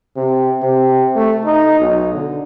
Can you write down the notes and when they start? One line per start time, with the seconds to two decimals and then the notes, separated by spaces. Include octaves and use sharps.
0.16 C3
0.63 C3
1.16 A3
1.45 D#4
1.80 B1
2.14 D3